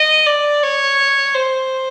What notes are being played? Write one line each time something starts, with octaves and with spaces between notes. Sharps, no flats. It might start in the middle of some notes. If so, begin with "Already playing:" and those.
Already playing: D#5
D5
C#5
C5